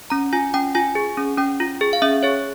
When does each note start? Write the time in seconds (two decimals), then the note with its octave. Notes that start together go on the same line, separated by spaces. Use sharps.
0.10 C#4 A#5
0.33 F4 G#5
0.54 C#4 G5
0.75 F4 G#5
0.95 G#4
1.17 C#4
1.38 C#4 G5
1.60 F4
1.81 G#4
1.93 F5
2.02 C#4 E5
2.23 G#4 C#5